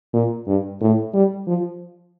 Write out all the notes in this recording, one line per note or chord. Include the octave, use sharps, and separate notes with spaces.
A#2
G2
A2
G3
F3